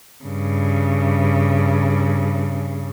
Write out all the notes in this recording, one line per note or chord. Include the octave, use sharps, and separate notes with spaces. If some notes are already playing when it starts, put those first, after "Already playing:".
G2 C#3